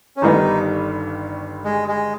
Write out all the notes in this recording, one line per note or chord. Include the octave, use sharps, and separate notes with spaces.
C#4
G1 G2 D#3 G3 B3 D#4
G#3
G#3